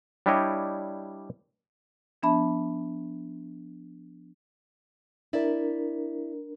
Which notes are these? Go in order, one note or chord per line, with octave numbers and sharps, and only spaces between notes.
G3 D4 E4 G4 C#5 D#5
F3 B3 D4 E5 A5 B5
D4 E4 A#4 D5 E5